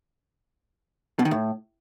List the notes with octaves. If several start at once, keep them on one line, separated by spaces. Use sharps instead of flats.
B2
D#3
A2